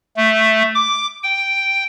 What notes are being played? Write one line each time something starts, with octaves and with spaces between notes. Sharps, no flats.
A3
D6
G5